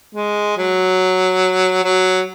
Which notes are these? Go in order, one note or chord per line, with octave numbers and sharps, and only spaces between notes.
G#3
F#3
F#3